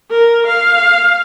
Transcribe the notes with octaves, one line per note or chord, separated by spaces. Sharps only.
A#4
F5